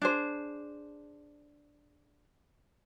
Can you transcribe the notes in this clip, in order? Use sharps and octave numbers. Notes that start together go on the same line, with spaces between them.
D4 G#4 C5